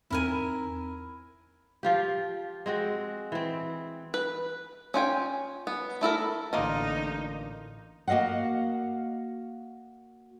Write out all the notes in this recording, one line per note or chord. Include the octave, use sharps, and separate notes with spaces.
E2 C4 D#4 E4 A#4 G#5
F3 F4 G4
G#3 C4 F#4
E3 C4
B4
C#4 F4 G5 G#5
B3
A3 E4 A4 A#4
A1 D3 A#3 D#4 F4 D#5
A#3 F#4 D#5 F5 F#5